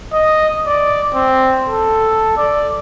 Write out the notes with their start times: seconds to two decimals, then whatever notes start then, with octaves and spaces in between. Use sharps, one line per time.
0.13 D#5
0.67 D5
1.14 C4
1.69 A4
2.37 D5